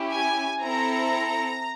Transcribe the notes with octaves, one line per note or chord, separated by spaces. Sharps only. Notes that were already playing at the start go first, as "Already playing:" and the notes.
Already playing: C#4 E4 G4
G#5
C4 E4 A4 A#5